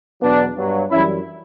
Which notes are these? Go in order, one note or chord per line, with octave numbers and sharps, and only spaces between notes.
E2 B2 F#3 B3 D4
G2 F#3
F#2 E3 G3 C#4 E4